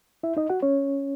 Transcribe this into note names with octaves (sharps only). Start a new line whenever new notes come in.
E4 E5
D#4 D#5
F#4 F#5
C#4 C#5